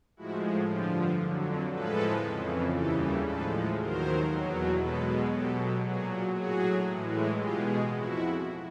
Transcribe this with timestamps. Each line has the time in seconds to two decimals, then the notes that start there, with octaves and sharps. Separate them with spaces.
0.17 A2 F3 G#3 E4 F#4
0.68 G2 D3 F3 F4 G4
1.19 F2 D3 F#3
1.71 A2 F3 G#3 A4 B4
2.23 F2 C#3 E3
2.74 D#2 C#3 E3 G3 G4 A4
3.26 A2 F3 G#3 A4 B4
3.78 D#2 D#3 F#3 A#4 C5
4.29 E2 B2 F#3
4.80 B2 G#3 A4 B4
5.32 B2 F#3 G4 A4
5.83 A#2 F#3 F#4 G#4
6.35 A2 F#3 F#4 G#4
6.87 A2 E3 G#3
7.38 B2 G#3 F4 G4
7.90 F2 E4 F#4